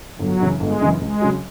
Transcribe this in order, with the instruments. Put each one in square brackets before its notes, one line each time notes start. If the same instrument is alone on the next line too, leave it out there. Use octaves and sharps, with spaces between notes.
[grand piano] G1 [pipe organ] F#3
[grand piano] F#2 C#3 E3
[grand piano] G1 [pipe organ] G#3
[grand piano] F#2 C#3 E3
[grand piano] C#2 [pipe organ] G#3
[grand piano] C#3 F#3